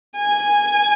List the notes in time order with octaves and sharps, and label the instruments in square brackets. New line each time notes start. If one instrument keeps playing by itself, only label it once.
[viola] G#5